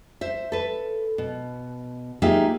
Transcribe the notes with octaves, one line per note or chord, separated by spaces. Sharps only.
C5 E5
A4 B4
B2
A#3 D#4 F4 G4 G#4 E5